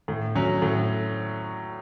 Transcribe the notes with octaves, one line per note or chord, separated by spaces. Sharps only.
A2
F#3 C#4
A2